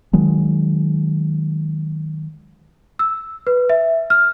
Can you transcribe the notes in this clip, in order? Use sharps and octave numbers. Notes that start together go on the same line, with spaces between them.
D#3 F#3 G#3
E6
B4
E5
F6